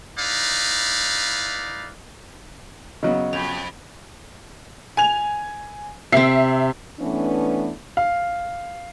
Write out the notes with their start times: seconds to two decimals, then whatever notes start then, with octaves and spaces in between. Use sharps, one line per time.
0.19 D#4 E4 B4 D5 F5
3.03 C#3 F#3 B3 D#5
3.33 F2 F7
4.97 G#5 F7
6.12 C3 C4 E5 C7
7.00 E3 A3 B3 C#4 D4
7.97 F5